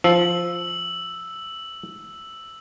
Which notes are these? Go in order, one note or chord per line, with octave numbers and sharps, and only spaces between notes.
F3 E6 F#7